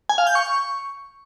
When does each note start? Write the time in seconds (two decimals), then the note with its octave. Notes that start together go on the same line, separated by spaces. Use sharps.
0.09 G#5
0.18 F5
0.27 G6
0.35 C#6